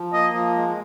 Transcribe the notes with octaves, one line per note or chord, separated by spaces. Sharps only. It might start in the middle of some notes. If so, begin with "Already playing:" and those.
Already playing: F3
A#3 D#5
F3
G#3